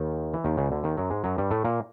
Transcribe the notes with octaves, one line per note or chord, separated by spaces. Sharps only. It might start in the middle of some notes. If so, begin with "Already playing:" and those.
Already playing: D#2 D#3
E3
D#2 D#3
C#2 C#3
D2 D3
D#2 D#3
F#2 F#3
G#2 G#3
F#2 F#3
G2 G3
A2 A3
A#2 A#3